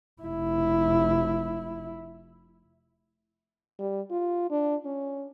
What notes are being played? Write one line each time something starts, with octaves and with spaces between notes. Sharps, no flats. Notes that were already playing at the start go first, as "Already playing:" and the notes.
F1 E4
G3
F4
D4
C#4